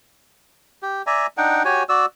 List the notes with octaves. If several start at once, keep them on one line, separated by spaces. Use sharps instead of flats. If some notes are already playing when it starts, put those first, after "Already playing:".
G4
D5 E5 G#5 A#5
D4 D#4 F#5 G5
F#4 G4 C#5 G#5
F#4 D5 E6